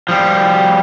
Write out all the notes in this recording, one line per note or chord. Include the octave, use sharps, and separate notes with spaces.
F3 G3